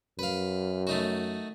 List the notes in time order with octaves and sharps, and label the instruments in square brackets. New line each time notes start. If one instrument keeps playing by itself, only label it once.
[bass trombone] F#2 [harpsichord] B4 F5
[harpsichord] A3 D#4 F#4